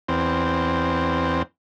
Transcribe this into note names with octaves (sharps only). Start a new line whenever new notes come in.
E2 C4